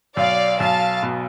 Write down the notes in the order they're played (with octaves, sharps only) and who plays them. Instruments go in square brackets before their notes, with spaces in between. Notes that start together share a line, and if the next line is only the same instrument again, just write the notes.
[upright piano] B1 [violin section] D5 F5
[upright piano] B1 [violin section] F5 A5
[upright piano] B2